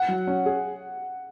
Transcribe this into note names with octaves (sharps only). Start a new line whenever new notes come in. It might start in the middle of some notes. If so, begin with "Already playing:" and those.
Already playing: F#5
F#3
C#4
G#4